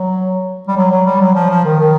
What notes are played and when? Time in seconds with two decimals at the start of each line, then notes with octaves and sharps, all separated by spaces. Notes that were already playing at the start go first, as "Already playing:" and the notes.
Already playing: F#3
0.68 G3
0.77 F#3
0.92 F#3
1.06 G3
1.21 F#3
1.35 F3
1.50 F3
1.65 D#3
1.79 D#3